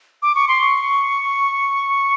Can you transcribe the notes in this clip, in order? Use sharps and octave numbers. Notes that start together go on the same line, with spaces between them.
D6
C#6
C6
C#6